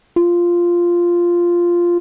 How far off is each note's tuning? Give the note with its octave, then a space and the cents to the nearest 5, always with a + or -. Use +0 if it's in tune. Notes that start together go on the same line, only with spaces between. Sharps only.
F4 -5